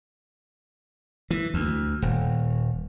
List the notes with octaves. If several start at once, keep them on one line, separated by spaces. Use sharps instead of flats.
E3
D2
D#1